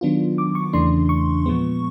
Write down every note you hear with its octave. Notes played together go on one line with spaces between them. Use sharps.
D#3 F#3 B3 D4 F4
D6
C#6
E2 C#3 E3 A3 D4 C6
C#6
A#2 F3 G#3 B3